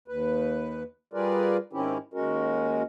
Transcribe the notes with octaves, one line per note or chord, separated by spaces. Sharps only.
D#2 B4
G3 F4 G#4 A#4 B4 D5
G#2 D#3 C4 C#4 E4 G4
D#2 G#3 C#4 F#4 A#4